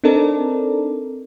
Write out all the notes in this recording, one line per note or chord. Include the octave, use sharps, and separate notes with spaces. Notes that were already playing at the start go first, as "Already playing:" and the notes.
C4 D4 D#4 A4 A#4 D5